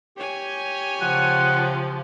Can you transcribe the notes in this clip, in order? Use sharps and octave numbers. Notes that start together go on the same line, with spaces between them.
G4 C#5 G#5
C#3 F3 F#5